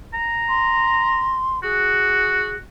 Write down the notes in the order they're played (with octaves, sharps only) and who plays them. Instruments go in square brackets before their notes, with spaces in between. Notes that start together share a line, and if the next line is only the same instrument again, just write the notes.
[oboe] A#5
[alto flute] C6
[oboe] F#4 [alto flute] G#4